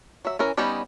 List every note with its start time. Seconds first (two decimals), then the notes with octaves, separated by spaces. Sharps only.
0.25 F#3 E5
0.39 E3 C#4 A#4
0.57 G3 B3 C#4 D#4 G4